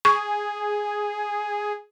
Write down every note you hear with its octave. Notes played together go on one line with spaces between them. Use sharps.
G#4 C#6